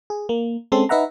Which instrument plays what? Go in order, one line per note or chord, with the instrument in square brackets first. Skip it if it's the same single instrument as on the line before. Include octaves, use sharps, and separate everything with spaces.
[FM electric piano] G#4
A#3
G#3 C4 C#4 A4 C6
D#4 B4 E5 F#5 A#5